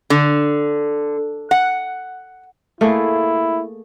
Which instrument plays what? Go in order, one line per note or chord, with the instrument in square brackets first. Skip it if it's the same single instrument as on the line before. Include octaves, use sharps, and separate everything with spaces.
[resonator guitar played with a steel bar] D3
F#5
[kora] A3 A#3 G#4 [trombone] E4